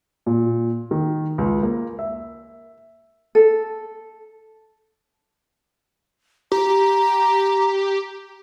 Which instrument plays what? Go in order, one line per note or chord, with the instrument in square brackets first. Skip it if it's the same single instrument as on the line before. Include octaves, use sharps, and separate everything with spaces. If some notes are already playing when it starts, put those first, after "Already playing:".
[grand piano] A#2
D#3
C#2
A#3
E5
[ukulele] A4
[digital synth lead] G4 [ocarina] A#5